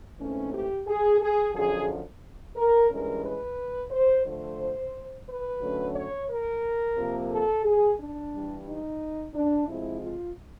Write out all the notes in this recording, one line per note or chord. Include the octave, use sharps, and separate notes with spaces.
G#2 E3 A3 C4 C#4
G4
G#4
G#4
F#2 D3 F3 G#4
A#4
G2 E3 G#3 C#4 A#4
B4
C5
D3 F3 A3 C5
B4
D3 F#3 A3 C#4
C#5
A#4
C3 F3 A#3
A4
G#4
D4
G2 E3 G3
D#4
D4
C3 F3 G#3 C4 E4
F4